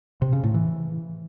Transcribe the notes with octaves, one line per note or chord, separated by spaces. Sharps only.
C3
C#3
A2
E3